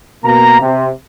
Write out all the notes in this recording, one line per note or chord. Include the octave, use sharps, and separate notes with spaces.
B2 A#3 A#5
C3